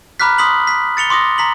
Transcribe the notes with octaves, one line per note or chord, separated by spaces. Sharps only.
A#5 B5 D6 F6 F#6 B6
C6 D#6 B6 F#7
B6
A6 C#7 F7 G7
C6 D6 D#6 A#6
A#5 B6 F#7